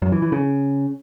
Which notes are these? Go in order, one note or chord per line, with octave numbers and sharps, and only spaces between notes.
F#2
E3
E3
C#3